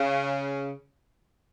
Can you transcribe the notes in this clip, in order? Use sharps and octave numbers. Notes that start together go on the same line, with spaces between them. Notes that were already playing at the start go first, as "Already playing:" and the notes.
Already playing: C#3